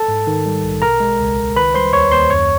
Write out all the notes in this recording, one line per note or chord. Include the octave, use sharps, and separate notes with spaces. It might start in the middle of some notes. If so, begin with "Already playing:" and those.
Already playing: A4 A5
G#2
D#3
G3
A#1
B2 A#4 A#5
G#3
C#2
C#2
D#3 B4 B5
G3 C5 C6
D#2 C#5 C#6
D#2 C5 C6
F#2 C#5 C#6